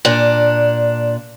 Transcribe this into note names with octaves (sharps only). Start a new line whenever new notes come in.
A#2 D4